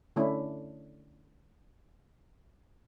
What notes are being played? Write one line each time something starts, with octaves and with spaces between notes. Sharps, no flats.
D3 A3 C#4 D4 E4